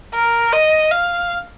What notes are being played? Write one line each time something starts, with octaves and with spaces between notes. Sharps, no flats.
A#4
D#5
F5